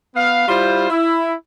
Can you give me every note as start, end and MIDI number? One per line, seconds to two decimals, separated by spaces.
0.16 0.47 59
0.16 0.47 77
0.48 0.88 55
0.48 0.88 64
0.48 0.88 65
0.48 0.88 72
0.90 1.34 64